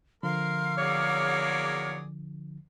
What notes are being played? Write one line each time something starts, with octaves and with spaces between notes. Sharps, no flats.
D3 F3 A#4 F5 C6 F6
E2 F#3 A#3 G#4 C#5 D5